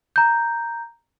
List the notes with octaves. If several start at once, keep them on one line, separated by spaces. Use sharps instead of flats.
A#5 G6